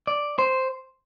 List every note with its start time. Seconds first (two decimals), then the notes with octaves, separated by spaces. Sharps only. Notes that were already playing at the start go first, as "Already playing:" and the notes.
0.07 D5
0.39 C5